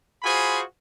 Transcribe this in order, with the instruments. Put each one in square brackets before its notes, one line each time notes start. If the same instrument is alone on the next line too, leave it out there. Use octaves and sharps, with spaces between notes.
[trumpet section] F4 F#4 G#4 C5 G#5 B5